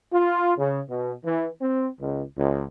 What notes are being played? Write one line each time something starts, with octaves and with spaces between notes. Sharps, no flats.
F4
C#3
B2
E3
C4
C#2
C#2